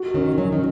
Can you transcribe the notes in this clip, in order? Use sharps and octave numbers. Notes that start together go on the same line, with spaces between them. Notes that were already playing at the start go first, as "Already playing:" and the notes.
Already playing: F#4
D#3 C#4
F#3 C#4
D#3